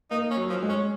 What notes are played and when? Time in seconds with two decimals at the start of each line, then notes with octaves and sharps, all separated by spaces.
0.11 A#3 D#4
0.30 C#4
0.37 F#3
0.49 F3
0.62 G#3
0.69 C#4